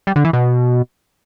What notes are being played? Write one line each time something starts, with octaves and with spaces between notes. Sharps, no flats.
G3
D3
E3
B2